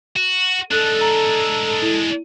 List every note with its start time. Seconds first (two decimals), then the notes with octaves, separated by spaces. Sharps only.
0.16 F#4
0.71 G#3 D4 A4 F#6
1.01 A#5
1.82 E4